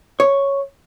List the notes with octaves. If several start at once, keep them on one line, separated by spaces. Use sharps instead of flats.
C#5